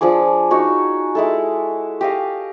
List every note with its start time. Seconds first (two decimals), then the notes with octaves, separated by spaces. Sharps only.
0.01 F3 D4 G#4 D6
0.51 D#4 F#4 C#5
1.15 G#3 E4 A4
2.01 G4 D#5 F5